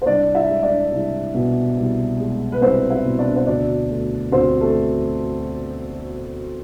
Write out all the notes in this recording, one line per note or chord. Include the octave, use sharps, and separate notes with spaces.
C5
C2 D4 D5
E4 E5
G#3
D4 D5
C2
B2
C2
G#3
B4
C2 C4 C5
E4 E5
B2
D4 D5
C5
D2 D4 D5
A3
D2 C4 C5
A3 A4